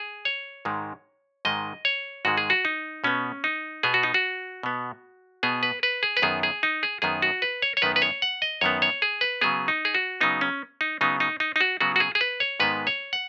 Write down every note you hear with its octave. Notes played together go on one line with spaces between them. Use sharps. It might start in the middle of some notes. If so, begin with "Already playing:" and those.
Already playing: G#4
C#5
G#2 D#3 G#3
G#2 D#3 G#3 D#5
C#5
G#2 D#3 G#3 F#4
G#4
F#4
D#4
B2 B3 C#4
D#4
B2 B3 G#4
F#4
D#4
F#4
B2 B3
B2 B3 G#4
B4
B4
G#4
B4
F#2 D#3 B3 G#4
G#4
D#4
G#4
F#2 D#3 B3 G#4
F#4
B4
C#5
C#5
F#2 D#3 B3 B4
B4
C#5
F#5
D#5
F#2 D#3 B3 C#5
C#5
G#4
B4
C#3 F#3 B3 G#4
D#4
G#4
F#4
C#3 F#3 B3 D#4
C#4
D#4
C#3 F#3 B3 D#4
D#4
D#4
D#4
F#4
C#3 F#3 B3 F#4
F#4
G#4
G#4
B4
C#5
G#2 D#3 G#3 B3 B4
C#5
F#5